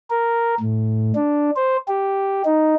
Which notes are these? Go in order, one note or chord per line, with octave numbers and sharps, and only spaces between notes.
A#4
A2
D4
C5
G4
D#4